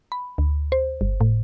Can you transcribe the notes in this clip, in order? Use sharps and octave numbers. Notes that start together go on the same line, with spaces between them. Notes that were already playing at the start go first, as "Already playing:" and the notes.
B5
D2
C5
G1
A2